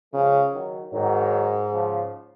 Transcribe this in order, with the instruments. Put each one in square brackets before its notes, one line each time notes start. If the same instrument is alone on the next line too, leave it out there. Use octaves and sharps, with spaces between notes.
[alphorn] C#3 [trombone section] F3 G#3
[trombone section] D#3 F#3
[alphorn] G#2 [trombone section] D#3 F#3
[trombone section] C#3 F3